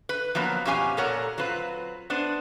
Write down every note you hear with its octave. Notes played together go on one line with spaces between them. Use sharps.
B4
F3 F#3 A#3 B3
F2 B2 C#4 G4 F5 G#5
A#2 A4 A#4 C#5 F#5
F#3 C4 F4 B4
B3 D4 C5